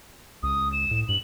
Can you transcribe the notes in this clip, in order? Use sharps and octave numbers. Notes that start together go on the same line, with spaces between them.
C#2 D#6
E7
A2
G2 F#7